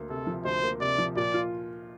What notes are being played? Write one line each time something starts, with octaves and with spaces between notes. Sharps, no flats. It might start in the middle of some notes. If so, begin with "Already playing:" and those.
Already playing: D2 A#3
C3 A4
F3
D2 C5
A#3
C3 D5
F3
A#2 D5
F4